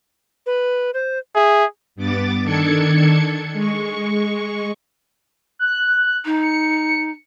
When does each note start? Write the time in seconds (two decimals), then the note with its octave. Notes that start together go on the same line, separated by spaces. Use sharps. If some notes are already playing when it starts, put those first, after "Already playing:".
0.46 B4
0.94 C5
1.35 G#4 E5
1.96 G2 B3 D6 A6
2.43 D#3 D4 A4 G#6 C#7
3.52 G#3 C#6
5.59 F#6
6.25 D#4
6.41 C#7